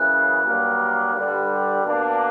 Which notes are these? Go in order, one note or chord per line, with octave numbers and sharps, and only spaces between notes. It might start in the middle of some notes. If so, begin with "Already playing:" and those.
Already playing: F#2 C#3 E3 F#6
G2 F#3 A#3
G2 D3 G3
B2 A#3 D4